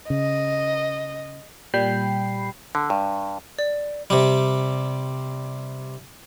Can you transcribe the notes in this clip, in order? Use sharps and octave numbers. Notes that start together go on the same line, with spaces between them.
C#3 D#5
A#2 G3 G5 B5 C7
D3
G2
D5
C3 G3